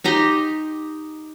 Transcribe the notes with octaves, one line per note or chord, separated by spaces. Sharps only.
D#4 G4 A#5 C6